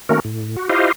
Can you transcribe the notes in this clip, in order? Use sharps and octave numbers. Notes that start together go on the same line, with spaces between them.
D#3 A3 A#3 C#4 F#4 A#4
A2
F#4
E4 F4 G4 C5 D#5 F5